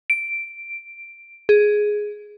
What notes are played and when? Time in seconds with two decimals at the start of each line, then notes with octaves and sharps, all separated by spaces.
0.10 D7
1.49 G#4